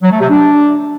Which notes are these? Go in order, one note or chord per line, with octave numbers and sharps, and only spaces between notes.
F#3
A3
C3
D4